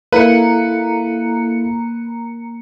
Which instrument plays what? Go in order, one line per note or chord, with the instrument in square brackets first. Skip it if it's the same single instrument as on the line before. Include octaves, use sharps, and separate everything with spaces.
[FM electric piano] A#3 C#7 [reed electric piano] E4 A4 F5 [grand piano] B4 [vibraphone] A#5